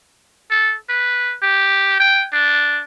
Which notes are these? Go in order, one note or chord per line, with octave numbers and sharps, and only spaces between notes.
A4
B4
G4
G5
D4